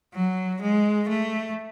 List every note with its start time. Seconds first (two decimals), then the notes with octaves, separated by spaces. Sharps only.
0.14 F#3
0.61 G#3
1.09 A3